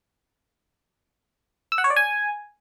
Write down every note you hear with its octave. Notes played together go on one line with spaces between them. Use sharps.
E6
F#5
C#5
D5
G#5